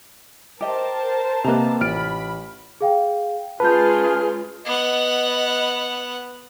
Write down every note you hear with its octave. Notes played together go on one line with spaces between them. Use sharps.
G4 A#4 C5 D#5 G5 A5
C3 A#3 B4 D#5 A#5
A1 F4 B5 F6 D7
G#4 F5 G5
G#3 C#4 F4 G#4 B4 A5 F6 G6
B3 D#5 F#5